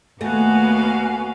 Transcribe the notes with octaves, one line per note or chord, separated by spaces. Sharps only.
D#2 A3 B3 F#4 F5 G#5